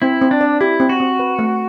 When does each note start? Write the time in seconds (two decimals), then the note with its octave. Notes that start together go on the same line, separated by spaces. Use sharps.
0.02 C4 E4
0.22 C4
0.31 D4
0.41 D5
0.61 E4 G4
0.80 C4
0.89 F#4
1.00 C4
1.19 B4
1.39 A3